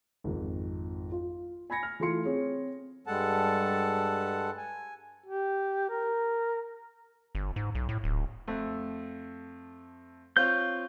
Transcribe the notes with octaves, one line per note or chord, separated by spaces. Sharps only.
G#1 F2
F4
G#5 B5 G#6 A#6 C#7
F6
E3 A3 F4 C6 C#7
C4 G#4 C#5
G2 G3 G#3 A4 F#5 A5
G#5
G4
A#4
G1
G#2
B1
A2
D1
F2 A3
C4 F4 C#5 G6